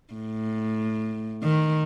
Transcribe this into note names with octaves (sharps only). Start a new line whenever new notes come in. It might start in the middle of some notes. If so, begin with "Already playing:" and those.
A2
D#3